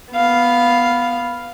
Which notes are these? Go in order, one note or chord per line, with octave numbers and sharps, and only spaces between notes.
B3 F5